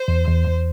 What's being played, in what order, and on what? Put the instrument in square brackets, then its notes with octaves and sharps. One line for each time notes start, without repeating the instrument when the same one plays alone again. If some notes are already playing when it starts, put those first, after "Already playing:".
Already playing: [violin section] C5
[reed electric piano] E2
E2
E2